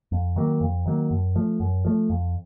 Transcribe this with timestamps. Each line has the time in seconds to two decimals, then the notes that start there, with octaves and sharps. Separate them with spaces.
0.12 F2
0.36 D#3 F#3 A#3
0.61 F2
0.86 D#3 F#3 A#3
1.11 F#2
1.36 F3 A3
1.60 F#2
1.85 F3 A3
2.10 F2